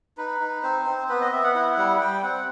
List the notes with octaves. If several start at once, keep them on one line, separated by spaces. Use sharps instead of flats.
D#4 B4
D#4
C4 C5
C4
B3 B4
D#5
B3 E5
F#5
E4 F#5
G3 F#5
G3 G5
C4 F#5